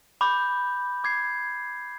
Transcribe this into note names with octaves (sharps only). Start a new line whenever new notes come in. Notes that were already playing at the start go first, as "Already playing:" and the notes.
B5 D6 G6
D6 G#6 C7